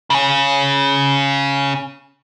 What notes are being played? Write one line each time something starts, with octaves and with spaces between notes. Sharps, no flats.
C#3 C#4